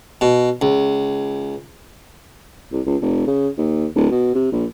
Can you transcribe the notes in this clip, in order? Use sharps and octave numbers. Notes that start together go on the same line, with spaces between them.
B2
C#2
C2
C#2
F1
C#3
D#2
D1
B2
C3
A#1